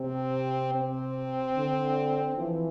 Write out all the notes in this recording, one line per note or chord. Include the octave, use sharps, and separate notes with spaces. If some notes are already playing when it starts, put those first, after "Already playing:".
Already playing: C3 C4
C4
D3
E3 F3